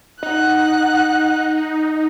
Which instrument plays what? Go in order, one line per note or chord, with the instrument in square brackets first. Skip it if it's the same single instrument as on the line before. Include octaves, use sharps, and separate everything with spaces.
[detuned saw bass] D#4 [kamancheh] F#5 F#6